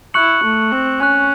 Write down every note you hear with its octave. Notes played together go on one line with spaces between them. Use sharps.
E4 C#6 F#6 C#7 F#7
A3
C4
C#4 G#5 C#6 F#6